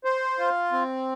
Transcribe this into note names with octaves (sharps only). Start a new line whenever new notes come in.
C5
F4
C4